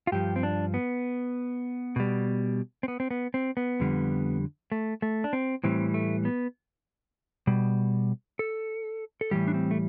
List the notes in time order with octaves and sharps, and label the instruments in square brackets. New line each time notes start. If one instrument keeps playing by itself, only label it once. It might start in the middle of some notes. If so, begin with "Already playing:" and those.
[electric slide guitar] F4
G2 F3 G4
C4
D4
B3
B2 G3
C4
B3
C4
B3
C4
B3
F2 D3 G3
A3
A3
D4
C4
A2 E3 G3 C4
A3
B3
B2 G3
A4
A4
A2 E3 G3 G4
D4
C4
A3